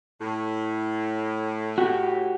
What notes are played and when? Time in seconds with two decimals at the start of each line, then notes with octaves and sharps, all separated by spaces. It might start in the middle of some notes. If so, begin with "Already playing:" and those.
0.20 A2
1.78 F#4 G4